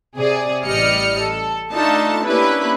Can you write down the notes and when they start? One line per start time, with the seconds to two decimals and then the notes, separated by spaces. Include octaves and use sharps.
0.18 C3 G#4 D5
0.64 A1 G3 D5 D#5 F6 C#7
1.20 A4
1.73 A3 D4 D#4 F4 A4 A5
2.23 A#3 C#4 D4 E4 G4 B4